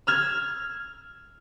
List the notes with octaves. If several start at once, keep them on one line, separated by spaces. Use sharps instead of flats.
E6 F6 G#6